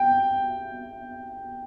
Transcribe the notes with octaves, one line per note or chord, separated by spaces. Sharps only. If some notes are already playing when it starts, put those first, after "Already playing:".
Already playing: G5